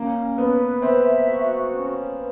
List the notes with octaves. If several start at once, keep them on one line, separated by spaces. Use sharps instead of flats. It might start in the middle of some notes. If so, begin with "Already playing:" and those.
Already playing: A#3 C#4
B3 B4
C4 E5
F#4
C#4
B4